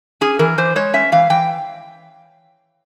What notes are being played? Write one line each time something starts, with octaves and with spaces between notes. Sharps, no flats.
C#4 G#4
E3 A#4
E3 C5
G#3 C#5
C#4 E5
E3 F5
E3 G5